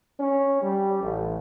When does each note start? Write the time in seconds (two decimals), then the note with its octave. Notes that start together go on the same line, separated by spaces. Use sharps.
0.19 C#4
0.61 G3
1.01 A1